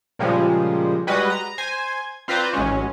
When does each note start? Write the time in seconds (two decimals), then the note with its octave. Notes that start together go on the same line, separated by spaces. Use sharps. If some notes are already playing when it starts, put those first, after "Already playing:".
0.19 A#2 C#3 F3 G3 G#3
1.07 G3 G#3 F#4 B4 D#5
1.30 A#5
1.58 C5 G#5
2.28 C4 F4 B4 C5 D5 A#5
2.53 A1 F#3 G#3 C#4